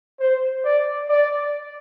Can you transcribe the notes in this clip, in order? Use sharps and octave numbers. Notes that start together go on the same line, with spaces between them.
C5
D5
D5